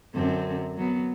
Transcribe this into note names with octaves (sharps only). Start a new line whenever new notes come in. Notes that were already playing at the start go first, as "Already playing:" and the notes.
F#2 D3 C4
F#3 B3